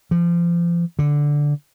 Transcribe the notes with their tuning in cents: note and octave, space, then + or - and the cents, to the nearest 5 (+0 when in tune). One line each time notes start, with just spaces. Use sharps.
F3 -30
D3 -5